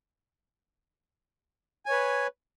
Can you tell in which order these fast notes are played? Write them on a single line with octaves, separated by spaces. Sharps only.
G#5 C#5 B4